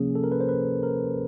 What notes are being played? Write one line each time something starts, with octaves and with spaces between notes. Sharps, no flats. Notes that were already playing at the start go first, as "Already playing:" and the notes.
Already playing: C3 F3 A#3 C#4 G#4
A4
A#4
B4
C5
B4
A#4